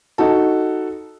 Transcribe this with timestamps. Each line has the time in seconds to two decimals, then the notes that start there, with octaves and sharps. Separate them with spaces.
0.18 D#4 F#4 A4